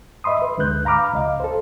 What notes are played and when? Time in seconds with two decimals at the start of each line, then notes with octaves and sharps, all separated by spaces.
0.24 D#5 E5 B5 C6 D#6
0.42 B4
0.58 D2 D3 G#3 B4 F#6 G6
0.85 F5 A#5 B5 D6 F6
1.13 C#2 D#5 F5
1.40 A4 C5